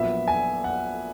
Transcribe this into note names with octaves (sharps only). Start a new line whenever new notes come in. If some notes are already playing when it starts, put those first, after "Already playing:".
Already playing: A#1 A#2 F#3 B3 E5
G#5
F#5